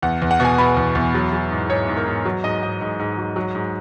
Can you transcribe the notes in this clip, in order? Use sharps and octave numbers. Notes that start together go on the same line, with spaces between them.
E2 F#5
E2
F#5
B2 G#5
B2 B5
E2
E2
F#3
F#3
G#2
G#2 C#5
G#2
A#4
G#2
F#3
G#2 D#5
G#2 D#5
G#2
G#2
F#3
F#3
G#2